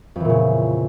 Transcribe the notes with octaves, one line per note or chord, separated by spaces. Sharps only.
F2 A#2 C#3 E3